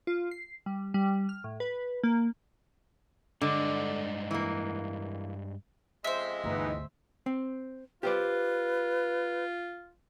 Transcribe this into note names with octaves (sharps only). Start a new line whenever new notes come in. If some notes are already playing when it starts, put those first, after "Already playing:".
F4
C7
G3
G3
F6
A2
B4
A#3
G2 D3 G#3 D#5
E3 A#3
F2 C#3 G#3 C5 E5
G1 D2 E3 B3 D#4
C4
F4 G4 B4 C5 D5